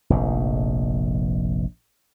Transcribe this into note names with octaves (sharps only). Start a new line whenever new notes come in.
F1 A#1 G#2